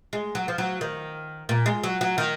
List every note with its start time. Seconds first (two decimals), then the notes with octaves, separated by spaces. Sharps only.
0.13 G#3
0.35 F#3
0.48 F3
0.58 F#3
0.81 D#3
1.49 A#2
1.66 G#3
1.84 F#3
2.01 F#3
2.18 D#3